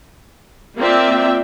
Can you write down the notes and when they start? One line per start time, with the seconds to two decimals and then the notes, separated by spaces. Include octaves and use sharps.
0.78 A#3 C4 F4 D5 E5 G5